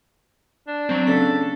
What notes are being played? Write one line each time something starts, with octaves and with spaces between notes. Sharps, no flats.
D4
F#3 C4
C#3 D4 A4 B6